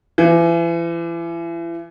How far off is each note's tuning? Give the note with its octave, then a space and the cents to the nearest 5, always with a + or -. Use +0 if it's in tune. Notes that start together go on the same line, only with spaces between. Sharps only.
E3 +35